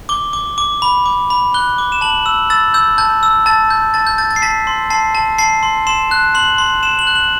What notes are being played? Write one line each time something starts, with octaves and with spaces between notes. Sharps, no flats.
D6 G7
D6
D6
B5
D6
B5
F#6 G7
D6
E7
A5 F#7
E6
E6 A6
E6 G6
A5 G6
E6
A5 A6
G6
A5 A6
G6
G6 A6
A6
C7
A5 B6
C6
A5 C7
A5
A5 C7
C6
C6 E7
F#6
C6 F#7
C6
C6 E7
F#7
F#6
F#7